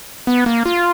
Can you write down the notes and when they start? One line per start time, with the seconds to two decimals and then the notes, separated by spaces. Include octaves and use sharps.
0.27 B3
0.46 A#3
0.66 F4